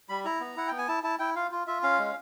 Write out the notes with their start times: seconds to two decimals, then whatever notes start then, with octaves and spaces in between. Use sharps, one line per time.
0.09 G3 B5
0.25 E4 A#5
0.41 B3
0.57 E4 F#5
0.68 B3 G5
0.78 G#5
0.88 E4 A5
1.04 E4 A5
1.19 E4 G5
1.36 F4 F5
1.51 F4
1.67 F4 E5
1.83 C#4 F5
1.99 G#3